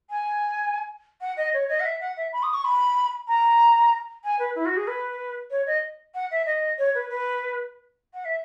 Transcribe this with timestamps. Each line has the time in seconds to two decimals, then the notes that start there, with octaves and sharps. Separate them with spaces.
0.10 G#5
1.20 F#5
1.37 D#5
1.53 C#5
1.69 D#5
1.80 F#5
1.84 E5
2.00 F#5
2.16 E5
2.32 B5
2.42 D#6
2.53 C#6
2.64 B5
3.28 A#5
4.24 G#5
4.39 B4
4.55 E4
4.65 F#4
4.76 G#4
4.87 B4
5.50 C#5
5.66 D#5
6.14 F#5
6.31 E5
6.45 D#5
6.78 C#5
6.94 B4
7.09 B4
8.13 F#5
8.25 E5